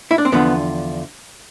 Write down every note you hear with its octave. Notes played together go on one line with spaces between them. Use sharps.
E4
D4
C4
E2 D3 F3 B3